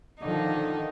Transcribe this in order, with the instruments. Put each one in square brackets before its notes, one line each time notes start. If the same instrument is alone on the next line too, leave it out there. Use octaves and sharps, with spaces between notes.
[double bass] D3 F3 [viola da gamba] D#3 D#4